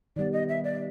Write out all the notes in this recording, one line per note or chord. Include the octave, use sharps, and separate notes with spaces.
D#3 G3 B3 D5
D#5
E5
D5